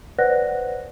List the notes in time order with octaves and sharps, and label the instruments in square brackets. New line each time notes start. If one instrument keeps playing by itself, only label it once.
[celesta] B4 C5 D5 F#5 F#6 A#6